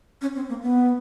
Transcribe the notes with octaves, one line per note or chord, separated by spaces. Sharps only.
C#4
C4
A#3
B3